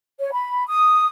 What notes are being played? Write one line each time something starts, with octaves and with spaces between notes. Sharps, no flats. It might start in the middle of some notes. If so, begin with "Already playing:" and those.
C#5
B5
D#6